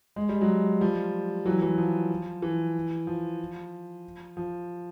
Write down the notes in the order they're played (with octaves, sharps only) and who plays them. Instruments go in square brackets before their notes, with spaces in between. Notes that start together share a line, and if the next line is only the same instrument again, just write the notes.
[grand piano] G#3
G3
F#3 G#3
F3 G3
E3 F#3
E3 F#3
F3
E3
F3
F3